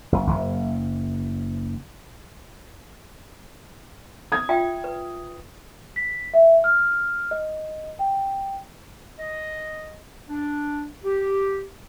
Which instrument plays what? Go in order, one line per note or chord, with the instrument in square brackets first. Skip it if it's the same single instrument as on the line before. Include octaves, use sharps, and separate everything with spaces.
[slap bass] F#1
F#1
[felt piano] D#6 G#6
[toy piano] F4 E5 G5
B4
[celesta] B6
E5
F6
D#5
G5
[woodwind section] D#5
D4
G4